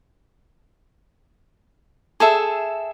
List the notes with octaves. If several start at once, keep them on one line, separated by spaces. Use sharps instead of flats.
G#4 A4 E5